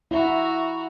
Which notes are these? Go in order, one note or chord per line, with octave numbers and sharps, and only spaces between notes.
E4 F#4 A#5